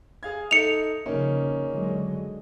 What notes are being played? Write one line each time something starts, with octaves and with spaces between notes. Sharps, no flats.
G#4 F5 G#6
D#4 A4 E5 C#7 F7
C#3 F3 A#3 C#4 D#4
D3 F#3 G#3